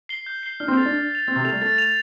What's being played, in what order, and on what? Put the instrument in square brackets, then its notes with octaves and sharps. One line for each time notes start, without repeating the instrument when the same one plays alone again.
[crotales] C7 G7
G6
C7 G7
[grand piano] D4 [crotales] F6
[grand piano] C4
[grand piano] A3 [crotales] A6 F7
[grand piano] D4
[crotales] F6
A6 F7
[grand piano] C4 [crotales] A6
[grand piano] C3
[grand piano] A3 [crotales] F7
[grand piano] G3
[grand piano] A3 [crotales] A6
[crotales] F7